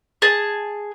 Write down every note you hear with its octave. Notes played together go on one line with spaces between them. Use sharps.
G#4 A5